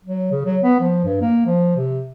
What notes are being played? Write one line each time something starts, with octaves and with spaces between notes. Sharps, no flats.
F#3
C#3
F#3
B3
F3
G2
A#3
F3
C3